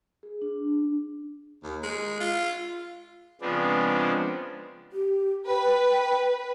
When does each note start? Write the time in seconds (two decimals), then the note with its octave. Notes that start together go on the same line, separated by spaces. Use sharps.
0.23 G#4
0.42 D4
1.63 D#2
1.83 G#3
2.20 F4
3.41 C#3 F3 G#3 B3 C4 D4
4.92 G4
5.47 B4 G5